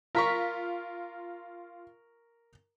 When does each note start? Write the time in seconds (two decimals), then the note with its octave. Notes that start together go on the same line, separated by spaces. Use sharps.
0.15 F4 A#4 A#5 C#6 B6